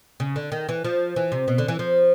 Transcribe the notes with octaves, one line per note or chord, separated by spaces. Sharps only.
C#3
D3
D#3
E3
F3
E3
C3
B2
D3
E3
F3